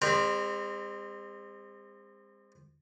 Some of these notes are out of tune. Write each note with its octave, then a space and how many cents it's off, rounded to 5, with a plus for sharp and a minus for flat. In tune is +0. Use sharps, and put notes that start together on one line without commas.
G#3 -45 C4 +0 A#4 +20